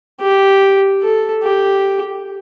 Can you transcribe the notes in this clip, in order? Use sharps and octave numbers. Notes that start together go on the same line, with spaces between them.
G4
A4
G4